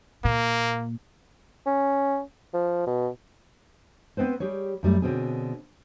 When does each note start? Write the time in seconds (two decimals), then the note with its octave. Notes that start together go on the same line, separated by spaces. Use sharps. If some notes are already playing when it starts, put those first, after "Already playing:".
0.24 A#2 A#3
1.66 C#4
2.54 F3
2.87 B2
4.17 B3 C4 B4 C5
4.40 G3 G4 G#4 C#5
4.83 F#2 G3 A3
5.02 B2 D3 C4 C#4 G#4